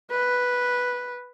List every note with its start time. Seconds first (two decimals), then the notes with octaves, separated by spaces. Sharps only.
0.11 B4